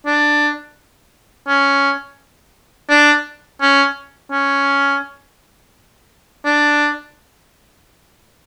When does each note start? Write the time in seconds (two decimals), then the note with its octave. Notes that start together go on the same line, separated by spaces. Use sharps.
0.06 D4
1.48 C#4
2.90 D4
3.62 C#4
4.32 C#4
6.45 D4